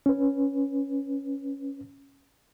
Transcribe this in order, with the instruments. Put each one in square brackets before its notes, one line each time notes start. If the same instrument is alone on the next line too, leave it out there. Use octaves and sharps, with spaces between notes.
[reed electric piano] C#4 B4